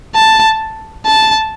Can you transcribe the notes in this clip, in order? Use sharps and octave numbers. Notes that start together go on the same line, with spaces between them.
A5
A5